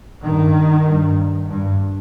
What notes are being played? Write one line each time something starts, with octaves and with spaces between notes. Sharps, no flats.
G2 D#3
G2
G2